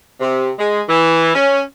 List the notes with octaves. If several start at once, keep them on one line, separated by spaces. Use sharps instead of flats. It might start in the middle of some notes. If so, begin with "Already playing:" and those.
C3
G#3
E3
C#4